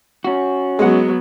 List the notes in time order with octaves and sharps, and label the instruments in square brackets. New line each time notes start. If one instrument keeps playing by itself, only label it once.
[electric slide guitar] C#4 F#4
[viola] F#3 B3 [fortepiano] G#3 F#5